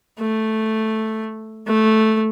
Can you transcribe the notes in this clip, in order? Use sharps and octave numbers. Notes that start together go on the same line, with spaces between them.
A3
A3